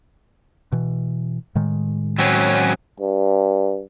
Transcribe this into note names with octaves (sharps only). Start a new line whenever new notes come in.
B2 E3
A2 D#3 G#3
F#3 C4 C#4
G2